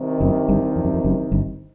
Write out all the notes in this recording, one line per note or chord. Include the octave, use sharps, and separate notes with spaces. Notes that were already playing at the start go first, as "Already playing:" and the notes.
Already playing: C2 C3 D#3
F#1 F#2
G1 G2
F2
F#2
F2
F#1 F#2
G1 G2